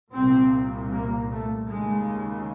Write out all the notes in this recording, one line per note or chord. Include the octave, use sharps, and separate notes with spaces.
C2 A#2 C4
A#3
A3
D#2 C#3 G#3